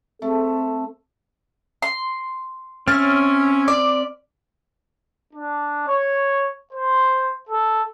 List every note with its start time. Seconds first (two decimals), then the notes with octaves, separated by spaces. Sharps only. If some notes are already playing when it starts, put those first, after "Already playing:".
0.22 A3 C4 A4
1.82 C6
2.88 C4 C#4 E5 F6 A6
3.68 D5 D6
5.33 D4
5.87 C#5
6.73 C5
7.49 A4